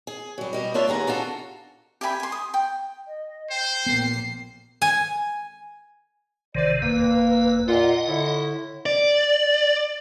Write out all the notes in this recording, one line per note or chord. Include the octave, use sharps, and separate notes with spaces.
G#4
F#3 G3
B2 G3 D#5
A#3 D4 F4 C#5 E5
D#2 B3 G#4 A#5
D4 F4 F#4 A4
G4 E5 G#5 B5
G#5 C6
D#6
G5
D#5
C5 G5
A#1 A#3 B3 C7
G#5
A1 C3 D#3 C5 D5
G1 E2 A#3 B4
A#2 F4 D#5 F#5
A2 D3 E4
D5